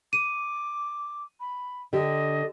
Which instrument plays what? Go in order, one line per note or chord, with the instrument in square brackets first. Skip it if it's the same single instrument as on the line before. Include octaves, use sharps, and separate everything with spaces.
[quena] D6 [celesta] D#7
[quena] B5
[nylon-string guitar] D3 G4 [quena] D#5